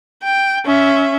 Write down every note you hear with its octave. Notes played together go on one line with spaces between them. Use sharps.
G5
C#4 E5